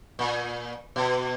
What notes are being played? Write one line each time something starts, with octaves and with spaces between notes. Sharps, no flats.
A#2
B2